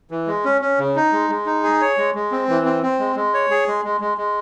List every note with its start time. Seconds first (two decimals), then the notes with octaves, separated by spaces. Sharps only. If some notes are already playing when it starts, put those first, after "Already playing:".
0.11 E3
0.27 G#3
0.45 C#4
0.61 C#4
0.79 C#3
0.96 D#4
1.12 G#3
1.30 G#3
1.46 D#4
1.63 G#4
1.81 C#5
1.98 G#3
2.15 G#3
2.32 C4
2.49 E3
2.65 C4
2.83 C4
2.99 G#3
3.16 G#3
3.34 C#5
3.51 G#4
3.68 G#3
3.84 G#3
4.01 G#3
4.18 G#3